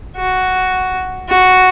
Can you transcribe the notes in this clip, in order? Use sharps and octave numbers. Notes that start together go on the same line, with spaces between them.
F#4
F#4